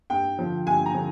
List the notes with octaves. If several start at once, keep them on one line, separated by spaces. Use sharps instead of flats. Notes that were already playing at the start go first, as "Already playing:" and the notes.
G2 G5
D3 F3
G2 G#5
A#5
D3 F3